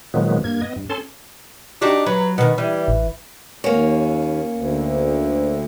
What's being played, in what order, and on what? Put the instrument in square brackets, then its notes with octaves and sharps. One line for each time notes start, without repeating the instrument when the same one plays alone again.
[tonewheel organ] A#2 D#3 F3 F#3 G#3 B3
G2 A#3 G#6
B3 D#5
G2
C#4 A4 A5 C6
[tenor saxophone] D4 [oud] D#4 F#4 G4
[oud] F#3 [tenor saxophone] B4
[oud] B2 D#3 [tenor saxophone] B3
[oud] E3 [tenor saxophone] G3
[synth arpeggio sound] A1
[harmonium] D#2 [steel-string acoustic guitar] A#3 C#4
[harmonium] D2